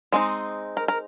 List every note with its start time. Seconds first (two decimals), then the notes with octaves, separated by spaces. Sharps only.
0.12 G#3 C4 D#4
0.77 A#4
0.88 A#4